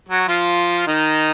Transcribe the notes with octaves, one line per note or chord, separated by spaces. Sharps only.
F#3 F#4
F3 F4
D#3 D#4